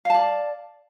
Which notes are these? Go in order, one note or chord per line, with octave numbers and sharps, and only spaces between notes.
D5 F5 A5